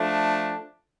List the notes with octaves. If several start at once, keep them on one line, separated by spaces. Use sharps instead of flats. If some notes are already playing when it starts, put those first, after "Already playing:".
Already playing: F3 A3 D4